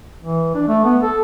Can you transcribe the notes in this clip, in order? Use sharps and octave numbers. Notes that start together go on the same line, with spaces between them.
E3
D4
A3
B3
A4